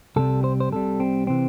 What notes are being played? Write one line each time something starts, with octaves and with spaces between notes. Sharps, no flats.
C2 C3 G3 A4
C5
C5
C2 C3 G3 A4
C4
C3 E3 C4